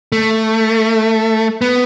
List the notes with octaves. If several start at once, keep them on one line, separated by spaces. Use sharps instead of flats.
A3
B3